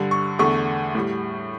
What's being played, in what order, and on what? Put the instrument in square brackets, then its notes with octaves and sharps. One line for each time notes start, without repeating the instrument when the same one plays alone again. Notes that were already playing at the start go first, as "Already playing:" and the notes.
Already playing: [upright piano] G2 D3 G3
C#6
E2 D3 A3 C#6
A2 G3